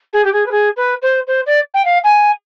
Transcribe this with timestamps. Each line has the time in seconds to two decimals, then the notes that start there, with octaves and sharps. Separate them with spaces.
0.13 G#4
0.24 G4
0.32 G#4
0.46 B4
0.51 G#4
0.76 B4
1.02 C5
1.27 C5
1.46 D5
1.74 G5
1.85 F5
2.04 G#5